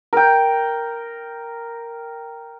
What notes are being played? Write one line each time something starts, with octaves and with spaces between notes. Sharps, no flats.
A#4 G5